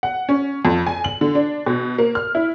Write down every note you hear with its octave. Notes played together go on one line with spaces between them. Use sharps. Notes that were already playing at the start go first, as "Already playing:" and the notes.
F#5
C#4
F2
G#5
F#7
D3
D4
B2
A#3
F6
E4